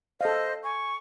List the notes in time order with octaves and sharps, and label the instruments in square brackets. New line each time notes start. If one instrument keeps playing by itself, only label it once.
[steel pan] A4 F5 [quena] C5 [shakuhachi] D#5
[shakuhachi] G#5 [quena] C#6